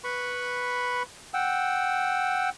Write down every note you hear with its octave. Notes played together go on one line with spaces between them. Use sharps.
B4 B5 C#6
F#5 G5 E6